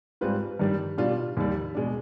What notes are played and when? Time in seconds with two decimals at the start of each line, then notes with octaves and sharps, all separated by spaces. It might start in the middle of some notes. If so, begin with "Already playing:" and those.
0.21 G#2 G3 C4 F4 B4
0.59 G2 D#3 G3 D4
0.98 B2 G3 D4 F4
1.37 D#2 D#3 G3
1.75 B2 G#3 D4